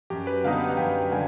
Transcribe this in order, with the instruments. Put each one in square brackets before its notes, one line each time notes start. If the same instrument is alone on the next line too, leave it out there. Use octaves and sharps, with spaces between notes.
[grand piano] F#2 [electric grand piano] G4
[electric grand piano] B4
[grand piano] D3 G3 B3 D#4 [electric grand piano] F5
[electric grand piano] F#5
[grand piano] F#2 [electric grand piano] G5
[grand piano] D3 G3 [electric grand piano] G#5